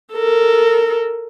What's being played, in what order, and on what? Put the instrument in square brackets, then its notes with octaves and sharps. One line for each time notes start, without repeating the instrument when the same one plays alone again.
[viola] A4 A#4